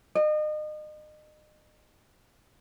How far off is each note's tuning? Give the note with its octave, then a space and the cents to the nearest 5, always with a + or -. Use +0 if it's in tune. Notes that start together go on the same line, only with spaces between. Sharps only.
D#5 -35